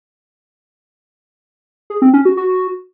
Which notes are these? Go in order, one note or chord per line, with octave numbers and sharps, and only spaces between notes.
G#4
C4
C#4
F#4
F#4